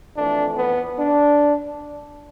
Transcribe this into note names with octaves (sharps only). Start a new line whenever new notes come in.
F2 E3 A3 D4
B3
D4